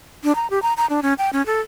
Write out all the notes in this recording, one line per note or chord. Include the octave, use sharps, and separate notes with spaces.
D4
A#5
G4
A#5
A#5
D4
C#4
G5
C#4
A4